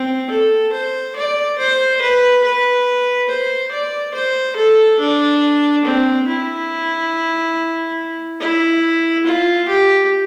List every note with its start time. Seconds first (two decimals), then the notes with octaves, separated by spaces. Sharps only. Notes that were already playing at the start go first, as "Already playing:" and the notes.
Already playing: C4
0.30 A4
0.73 C5
1.16 D5
1.58 C5
2.01 B4
2.44 B4
3.29 C5
3.71 D5
4.14 C5
4.57 A4
4.99 D4
5.85 C4
6.27 E4
8.40 E4
9.26 F4
9.68 G4